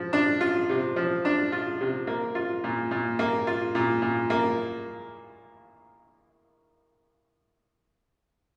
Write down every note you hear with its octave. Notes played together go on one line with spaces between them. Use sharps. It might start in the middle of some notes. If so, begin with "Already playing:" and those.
Already playing: F3
D4
F4
C3
F3
D4
F4
C3
A#3
F4
A#2
A#2
A#3
F4
A#2
A#2
A#3